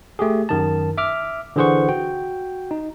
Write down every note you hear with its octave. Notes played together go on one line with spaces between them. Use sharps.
A3 G4 G#4
F#2 D#3 A5
E5 D6 F6
D3 E3 G#4 C5 F#5 C#6
F#4 G5
D#4